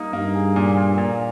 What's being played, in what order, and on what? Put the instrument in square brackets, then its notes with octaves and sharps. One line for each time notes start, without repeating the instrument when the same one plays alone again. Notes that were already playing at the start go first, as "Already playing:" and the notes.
Already playing: [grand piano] G3 A#3 D#4
[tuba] G2 [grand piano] A#3
[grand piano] G#4
A#2
A#2
A#2